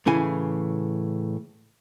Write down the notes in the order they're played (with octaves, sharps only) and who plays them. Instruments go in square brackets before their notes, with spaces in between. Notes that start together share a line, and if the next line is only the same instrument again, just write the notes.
[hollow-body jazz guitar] A2 C#3 E3 G#5